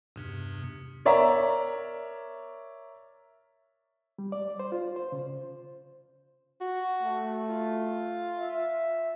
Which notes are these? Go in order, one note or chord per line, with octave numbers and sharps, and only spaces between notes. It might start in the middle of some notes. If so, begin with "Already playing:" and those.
E2 G2 C3
A#4 C#5 D5 E5 A#5
G3
D5
C5
F4
C5
C#3
F#4
A3
F4
E5